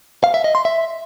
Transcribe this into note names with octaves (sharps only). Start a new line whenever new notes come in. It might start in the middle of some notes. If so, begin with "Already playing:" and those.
F5
E5
D#5
C6
E5